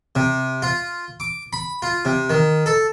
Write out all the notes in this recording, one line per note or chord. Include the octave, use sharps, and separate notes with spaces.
C3
F4
D6
B5
F4
C3
D#3
A4